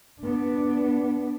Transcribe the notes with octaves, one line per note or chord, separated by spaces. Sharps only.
B3 D4